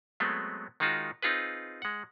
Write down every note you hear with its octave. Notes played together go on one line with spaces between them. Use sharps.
F#3 G#3 A3 B3 C4
D#3 G#3 D#4 F4 F#4
C4 D#4 F4 G#4 B4
G#3 F#5